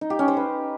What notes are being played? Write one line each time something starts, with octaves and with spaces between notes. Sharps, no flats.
D#4
G4
C#4
C5
B4